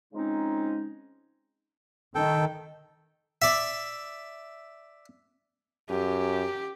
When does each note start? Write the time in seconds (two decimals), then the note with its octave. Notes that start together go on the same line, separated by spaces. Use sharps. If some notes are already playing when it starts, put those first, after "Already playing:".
0.13 C#3 F3 G#3 C4 C#4 D#4
2.15 D#3 A4 G5
3.42 D5 E5
5.90 F#2 G4